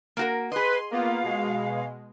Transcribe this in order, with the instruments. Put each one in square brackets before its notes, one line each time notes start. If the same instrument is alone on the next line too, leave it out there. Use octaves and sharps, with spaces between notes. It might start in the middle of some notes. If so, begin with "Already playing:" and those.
[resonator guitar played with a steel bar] A#3 F#4 A#4
[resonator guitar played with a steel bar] G#4 D#5 [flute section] B4 [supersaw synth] C6
[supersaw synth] A#3 B3 F4 [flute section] F5
[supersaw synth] B2 G#3